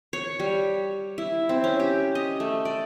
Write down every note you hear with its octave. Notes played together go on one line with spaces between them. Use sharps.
C#5
G3
E4
C4
C#4
G4
D#5
A3
D5